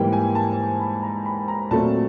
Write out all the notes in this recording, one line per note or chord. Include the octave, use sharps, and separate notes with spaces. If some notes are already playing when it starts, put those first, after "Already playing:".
Already playing: G#2 E3 G3 A#3 G5
G#5
A5
B5
A#5
B5
A#5
A#2 F#3 A3 C4 A5